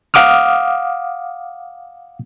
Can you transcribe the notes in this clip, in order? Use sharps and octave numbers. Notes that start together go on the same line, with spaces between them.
F5 F#5 D6 D#6 F6